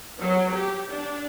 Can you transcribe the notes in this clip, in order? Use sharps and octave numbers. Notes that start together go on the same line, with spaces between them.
F#3
G4
D4